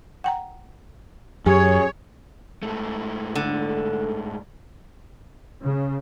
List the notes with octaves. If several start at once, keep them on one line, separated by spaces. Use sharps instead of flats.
F#5 G5 A#5
F#2 G4 G#4 C#5
G#2 A3
D3
C#3